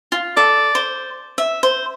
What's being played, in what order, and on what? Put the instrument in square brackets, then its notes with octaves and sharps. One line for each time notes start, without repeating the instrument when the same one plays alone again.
[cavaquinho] F4
[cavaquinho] A4 [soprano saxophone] D5
[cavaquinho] C5
E5
C5